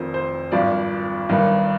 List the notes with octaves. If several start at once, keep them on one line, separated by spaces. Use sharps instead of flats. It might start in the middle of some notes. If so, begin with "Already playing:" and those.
Already playing: F1 F2 D#3 C5
C5
G#1 G2 F3 D5
G1 G2 D#3